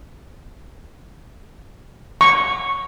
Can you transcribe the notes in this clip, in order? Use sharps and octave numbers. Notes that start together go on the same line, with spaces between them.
C#6